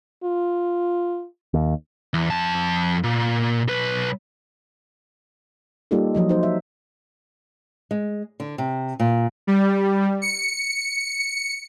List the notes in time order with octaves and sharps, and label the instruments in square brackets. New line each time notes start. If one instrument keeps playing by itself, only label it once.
[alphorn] F4
[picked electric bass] D#2
[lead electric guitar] E2
F2 A5
A#2
B1 B4
[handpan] G3 A#3 D#4 F4 G4 A4
F3 F#3 D#5
D#4 C5
E5
[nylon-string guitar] G#3
D3
C3
A#2
[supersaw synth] G3
C#7